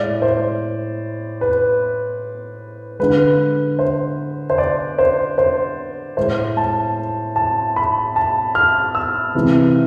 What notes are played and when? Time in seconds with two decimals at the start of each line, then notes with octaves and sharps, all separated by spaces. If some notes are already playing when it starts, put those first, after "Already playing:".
Already playing: A2 G#3 D5
0.22 C5
1.41 B4
3.00 D3 G#3 B4
3.79 C5
4.50 C5
4.58 D5
4.99 C5
5.38 C5
6.17 A2 G#3 C5
6.57 A5
7.36 A5
7.76 B5
8.16 A5
8.55 F6
8.95 E6
9.35 C3 E3 G#3